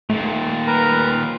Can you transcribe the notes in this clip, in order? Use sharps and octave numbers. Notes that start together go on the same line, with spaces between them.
D#2 A#2 A3
A#4 B4 A#5